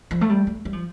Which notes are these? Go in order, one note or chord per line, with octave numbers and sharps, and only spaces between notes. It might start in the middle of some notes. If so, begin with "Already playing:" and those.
F3
A3
G3
A3
G3
F3